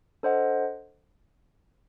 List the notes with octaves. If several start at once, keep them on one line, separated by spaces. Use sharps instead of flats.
D4 A4 C5 D#5 F#5